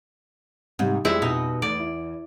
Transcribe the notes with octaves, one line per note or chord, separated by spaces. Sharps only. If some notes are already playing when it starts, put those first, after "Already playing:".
G#2 C3 G3
F2 G3 G#3 C4 E4
B2 D#4
E2 A3 D5
E4